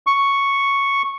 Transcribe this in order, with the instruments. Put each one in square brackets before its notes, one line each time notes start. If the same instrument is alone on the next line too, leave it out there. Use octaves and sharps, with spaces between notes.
[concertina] C#6